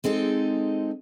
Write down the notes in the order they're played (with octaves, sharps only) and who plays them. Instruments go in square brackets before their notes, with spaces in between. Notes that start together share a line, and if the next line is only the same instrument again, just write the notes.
[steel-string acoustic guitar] G#3 C4 D#4 A4